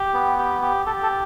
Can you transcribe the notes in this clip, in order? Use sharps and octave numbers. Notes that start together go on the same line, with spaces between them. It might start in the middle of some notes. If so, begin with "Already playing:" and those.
Already playing: G4
B3
G4
G4
G4 A4
A4